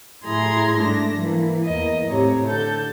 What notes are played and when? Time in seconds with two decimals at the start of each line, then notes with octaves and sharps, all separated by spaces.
0.24 A2 E4 G#4 A#5 C6 G#6
0.76 G#2 G3 A3 D4 A#6
1.15 E3 A#3
1.64 E2 A#3 D#5
2.07 A2 C3 C#5 A#5
2.46 D3 A4 G6